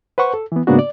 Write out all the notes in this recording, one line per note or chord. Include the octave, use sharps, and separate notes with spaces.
B4 C5 F#5 C#6
A4
E3 B3
G#2 C#3 A#3 B3 D4 F#4
D5